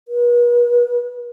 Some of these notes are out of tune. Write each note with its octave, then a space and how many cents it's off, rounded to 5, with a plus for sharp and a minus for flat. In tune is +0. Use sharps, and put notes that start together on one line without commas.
B4 -45